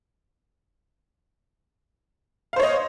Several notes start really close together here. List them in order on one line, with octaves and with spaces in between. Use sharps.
F5 C5 C#5 D#5